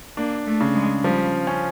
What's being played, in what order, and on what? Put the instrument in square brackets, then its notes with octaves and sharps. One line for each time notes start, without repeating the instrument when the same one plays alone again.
[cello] A#3 [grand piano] D4
[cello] A3
[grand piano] C#3
[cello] G#3
[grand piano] F3 [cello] G3
[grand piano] C#4